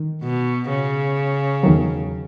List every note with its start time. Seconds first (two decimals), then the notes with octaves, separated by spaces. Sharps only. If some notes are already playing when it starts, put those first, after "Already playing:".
Already playing: D#3
0.23 B2
0.69 C#3
1.63 E2 D#3 F#3